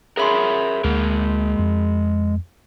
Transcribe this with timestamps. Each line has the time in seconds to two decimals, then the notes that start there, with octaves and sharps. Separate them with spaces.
0.17 G#4 A#4 C#5 E5 B5 C6
0.84 D2 G#3 A#3 A#4
1.59 F2